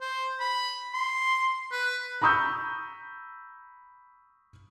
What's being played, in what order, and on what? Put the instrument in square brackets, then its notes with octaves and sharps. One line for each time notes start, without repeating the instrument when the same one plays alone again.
[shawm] C5
B5
C6
B4
[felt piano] A#5 B5 C#6 D#6 E6 G6